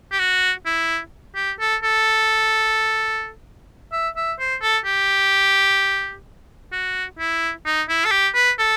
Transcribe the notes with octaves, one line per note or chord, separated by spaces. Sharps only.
G4
F#4
E4
G4
A4
A4
E5
E5
C5
A4
G4
F#4
E4
D#4
E4
A4
G4
B4
A4